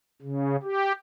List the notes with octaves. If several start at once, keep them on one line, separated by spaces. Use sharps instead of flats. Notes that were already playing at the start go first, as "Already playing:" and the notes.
C#3
G4